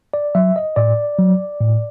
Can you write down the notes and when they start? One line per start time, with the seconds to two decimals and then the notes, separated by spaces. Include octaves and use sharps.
0.14 D5
0.35 F#3 E5
0.56 D#5
0.76 A2 D5
1.19 F#3
1.61 A2